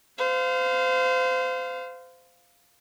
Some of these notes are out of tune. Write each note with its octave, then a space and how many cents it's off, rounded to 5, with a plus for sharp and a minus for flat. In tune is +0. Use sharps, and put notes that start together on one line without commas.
C5 -30 F5 +0